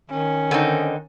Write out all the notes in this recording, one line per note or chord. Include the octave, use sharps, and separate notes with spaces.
D#3 C#4
D3 C4 D#4